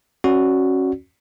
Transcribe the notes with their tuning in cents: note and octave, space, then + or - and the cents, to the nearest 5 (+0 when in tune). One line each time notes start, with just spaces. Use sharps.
C#4 -25 F#4 +0 D5 -15